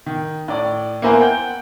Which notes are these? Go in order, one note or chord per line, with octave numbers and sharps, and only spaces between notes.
D#3
A2 D5
A#3 B3 E4 A#4 C5 G#5
F#5 G5 G6